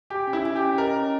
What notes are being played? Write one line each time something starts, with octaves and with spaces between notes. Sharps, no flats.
G4 G#5
C#4
E4
G#5
G4
C#4
A#4 D#5
C#4